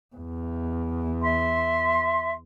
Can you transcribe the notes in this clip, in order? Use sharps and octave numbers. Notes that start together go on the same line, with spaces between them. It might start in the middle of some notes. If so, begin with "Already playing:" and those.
E2
E5 C6